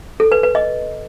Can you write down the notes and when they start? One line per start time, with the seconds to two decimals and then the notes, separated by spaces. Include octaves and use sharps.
0.20 A4
0.32 B4
0.43 B4
0.55 D#5